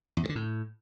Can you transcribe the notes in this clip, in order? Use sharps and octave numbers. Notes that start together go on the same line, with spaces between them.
E2
G2
D3
A2